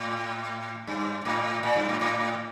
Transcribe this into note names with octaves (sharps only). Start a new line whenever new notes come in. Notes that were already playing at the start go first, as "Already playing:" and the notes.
Already playing: A2
G2
A2
A#2
G2
A2
A2